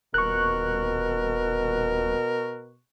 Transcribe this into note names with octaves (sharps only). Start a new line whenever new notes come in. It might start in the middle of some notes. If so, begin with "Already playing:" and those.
D#1 B2 A#4 C#6 F#6